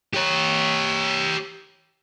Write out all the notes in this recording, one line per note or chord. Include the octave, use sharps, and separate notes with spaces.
G4 C#5